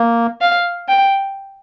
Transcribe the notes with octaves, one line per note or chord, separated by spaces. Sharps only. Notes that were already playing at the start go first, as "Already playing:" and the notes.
Already playing: A#3
F5
G5